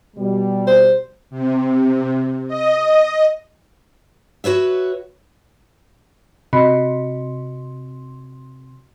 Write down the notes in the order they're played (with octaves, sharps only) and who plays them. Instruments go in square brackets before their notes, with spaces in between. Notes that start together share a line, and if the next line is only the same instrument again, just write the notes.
[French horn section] B2 G3
[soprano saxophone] C5
[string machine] C3
D#5
[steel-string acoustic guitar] F#4 B4 C#5 E5
[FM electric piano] C3 [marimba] F#4 D#5 B5